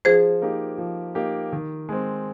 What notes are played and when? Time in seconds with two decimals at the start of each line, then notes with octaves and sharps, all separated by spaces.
0.05 F3 G#4 C5
0.42 A#3 D#4 G4
0.78 F3
1.15 A#3 D#4 G4
1.52 D#3
1.89 G#3 C4